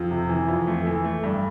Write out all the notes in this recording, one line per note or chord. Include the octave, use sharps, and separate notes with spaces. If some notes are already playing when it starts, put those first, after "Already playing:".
Already playing: F2
C3
E3
F2
A3
E3
A3
G2